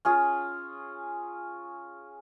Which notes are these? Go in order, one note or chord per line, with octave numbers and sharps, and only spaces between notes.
C#4 F4 G#4